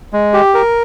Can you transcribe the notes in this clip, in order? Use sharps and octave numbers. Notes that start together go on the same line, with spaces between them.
G#3
G4
A#4